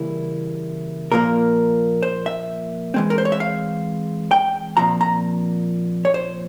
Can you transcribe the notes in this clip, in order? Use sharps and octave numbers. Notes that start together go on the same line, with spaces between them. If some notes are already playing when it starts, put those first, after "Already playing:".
Already playing: C#3 E3 G3 A#3 E4
A#2 F3 A#3 A#4
C5
E5
E3 G#3 C4
A#4
C5
C#5
E5
F5
G5
A#2 F3 C4 A#5
A#5
C#5
C5